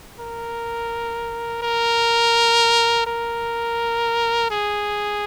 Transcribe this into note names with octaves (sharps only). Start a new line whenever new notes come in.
A#4
A#4
A#4
G#4